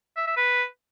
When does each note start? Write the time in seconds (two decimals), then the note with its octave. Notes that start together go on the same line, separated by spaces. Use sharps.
0.16 E5
0.26 E5
0.37 B4